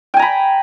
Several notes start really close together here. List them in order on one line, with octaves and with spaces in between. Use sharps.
G5 G#5 A#5 B5